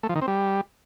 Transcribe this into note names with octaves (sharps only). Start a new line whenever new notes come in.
A3
F3
D#3
C4
G3